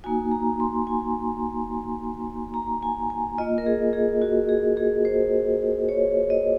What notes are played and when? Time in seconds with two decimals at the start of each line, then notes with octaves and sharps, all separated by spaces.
0.04 A#3 D#4 F#4 G#5
0.31 A#5
0.60 C6
0.87 G#5
2.54 A#5
2.83 G#5
3.10 G#5
3.38 A#3 F4 D#5
3.58 A#4
3.66 G#4
3.93 G#4
4.22 F#4
4.49 G#4
4.77 G#4
5.05 C5
5.89 C#5
6.30 D#5